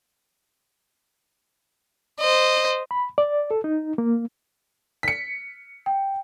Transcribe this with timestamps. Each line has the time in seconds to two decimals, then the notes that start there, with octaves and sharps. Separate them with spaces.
2.21 C5 D#5
2.91 B5
3.18 D5
3.51 A4
3.64 D#4
3.98 A#3
5.03 B6 C#7
5.86 G5